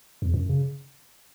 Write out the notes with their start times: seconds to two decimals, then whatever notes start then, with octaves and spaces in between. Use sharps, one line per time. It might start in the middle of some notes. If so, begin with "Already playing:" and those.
0.22 E2
0.34 F#2
0.49 C#3